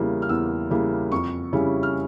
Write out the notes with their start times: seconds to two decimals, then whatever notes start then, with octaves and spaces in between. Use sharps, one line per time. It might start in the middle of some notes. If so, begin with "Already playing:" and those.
Already playing: E2 C#3 G3 A#3 E4
0.22 F6
0.29 E2 E6
0.70 C#3 G3 A#3 E4
1.12 F2 C#6
1.53 C#3 G3 C#4 E4
1.83 F6